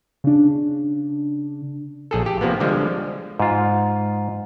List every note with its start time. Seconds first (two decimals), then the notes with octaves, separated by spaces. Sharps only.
0.24 C#3 D4
2.11 A#1 G#4 A4
2.26 G4
2.41 C3 F3 A#3 B3
2.60 D3 F3 G3 G#3
3.40 G#2 F4